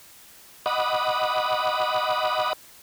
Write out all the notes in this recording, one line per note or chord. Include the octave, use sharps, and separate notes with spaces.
D#5 F#5 B5 D6 D#6